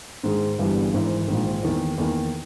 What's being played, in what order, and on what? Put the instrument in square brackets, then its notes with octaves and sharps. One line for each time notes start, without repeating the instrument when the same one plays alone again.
[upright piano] G#2 D#3 G#3
G1 G2 E3 G3 B3
G#1 G#2 E3
A#1 G#2 D#3
E2 D#3 A#3
E2 D#3 A#3